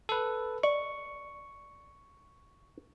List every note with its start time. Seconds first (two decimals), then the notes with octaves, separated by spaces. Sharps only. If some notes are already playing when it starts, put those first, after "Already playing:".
0.09 A4 B4
0.63 D5 C#6